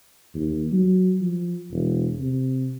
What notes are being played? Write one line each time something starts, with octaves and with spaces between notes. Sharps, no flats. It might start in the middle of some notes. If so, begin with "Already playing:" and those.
D#2
F#3
F3
E1
C3